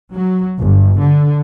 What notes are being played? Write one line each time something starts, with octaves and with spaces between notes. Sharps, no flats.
F#3
G1
D3